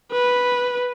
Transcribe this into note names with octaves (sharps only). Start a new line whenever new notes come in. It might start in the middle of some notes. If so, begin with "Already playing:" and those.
B4